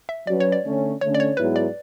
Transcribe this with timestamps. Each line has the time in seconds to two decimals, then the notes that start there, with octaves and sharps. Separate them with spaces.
0.09 E5
0.27 F#3 C#4 F#4 B4 D5
0.40 C#5
0.52 D5
0.65 D3 A3 C#4
1.01 D3 A3 C#4 C#5
1.14 D5
1.20 C#5
1.37 G#2 F#3 B3 E4 G#4 B4
1.56 D5